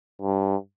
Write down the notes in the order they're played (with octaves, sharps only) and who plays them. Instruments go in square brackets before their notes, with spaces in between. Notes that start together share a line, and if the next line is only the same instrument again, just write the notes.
[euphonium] G2